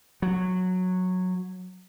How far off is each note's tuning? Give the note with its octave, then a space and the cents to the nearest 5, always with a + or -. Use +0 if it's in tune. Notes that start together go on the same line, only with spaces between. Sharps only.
F#3 -10